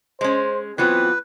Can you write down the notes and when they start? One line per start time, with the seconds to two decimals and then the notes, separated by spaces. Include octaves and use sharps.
0.21 G#3 C#4 C5
0.78 E3 F#3 B3 C4 F4 B4